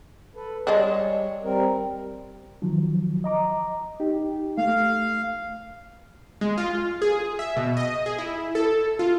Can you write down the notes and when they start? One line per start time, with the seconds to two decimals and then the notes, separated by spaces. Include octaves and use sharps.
0.35 A4 B4
0.67 G3 G#3 D4 C#5
1.44 G3 C4 A#4
2.62 D#3 F3 F#3
3.24 D#5 A#5 D6
4.00 D#4 G4
4.58 A3 F5
6.41 G#3
6.58 F4
7.02 G#4
7.39 E5
7.57 B2
7.77 D#5
8.06 G#4
8.18 E4
8.55 A4
8.99 F4